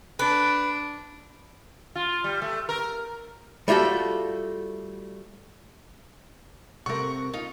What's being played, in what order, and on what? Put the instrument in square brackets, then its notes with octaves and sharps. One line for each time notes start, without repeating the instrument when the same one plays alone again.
[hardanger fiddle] D4 [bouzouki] B4
[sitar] F4
G3
A3
A#4
[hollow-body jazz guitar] G3 A3 F4 F#4 A4
[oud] C3 A3 [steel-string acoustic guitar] A#4 F#5 [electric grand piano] C#6
[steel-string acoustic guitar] D#4 F4